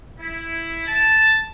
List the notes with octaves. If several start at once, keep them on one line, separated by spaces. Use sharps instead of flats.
E4
A5